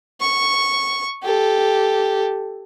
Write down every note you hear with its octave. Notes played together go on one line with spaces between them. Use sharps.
C#6
G4 A4